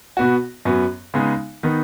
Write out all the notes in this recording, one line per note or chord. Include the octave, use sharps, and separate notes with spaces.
B2 B3 F#4
F#2 F#3 B3
C#3 G#3 B3 D#4
D#3 B3 D#4